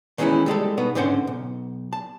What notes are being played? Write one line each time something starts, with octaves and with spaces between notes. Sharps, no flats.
D#3 E3 G#3 C#4 D#4 E4
G3 G#3 G4 A4
B2 B3 D#4
G#2 D3 C4 C#4 C5 F#5
B1
A5